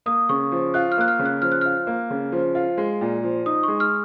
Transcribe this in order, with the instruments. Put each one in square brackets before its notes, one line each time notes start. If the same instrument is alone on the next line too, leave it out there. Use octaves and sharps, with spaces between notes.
[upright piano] A#3 [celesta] D#6
[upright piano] C#3 [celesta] C#6
[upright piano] F3
[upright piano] F4 [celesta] F#6
[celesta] F6
[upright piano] A#3 [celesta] F#6
[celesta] F6
[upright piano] C#3
[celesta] F#6
[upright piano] F3 [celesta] F6
[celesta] F#6
[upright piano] F4 [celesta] F6
[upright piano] A#3
C#3
F3
F4
G#3
A#2
F3
[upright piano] D#4 [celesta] D#6
[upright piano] G#3 [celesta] C#6
[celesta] F6